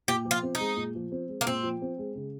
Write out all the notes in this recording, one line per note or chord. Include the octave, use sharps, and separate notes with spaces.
A#2 G4
F3
F4
C4
G#3 D#4
A#2
F3
C4
G#3
A#3
A#2 C4
F3
C4
G#3
C#3